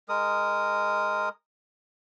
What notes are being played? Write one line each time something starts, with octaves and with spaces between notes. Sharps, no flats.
G#3 A#4 D#6